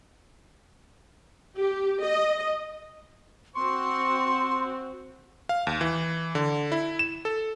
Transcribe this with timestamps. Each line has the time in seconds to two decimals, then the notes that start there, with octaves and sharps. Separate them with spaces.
1.57 G4
2.03 D#5
3.55 C4 F#4 C6 C#6
5.49 F5
5.67 D#2
5.81 E3
6.35 D3
6.72 E4
6.99 E7
7.25 A4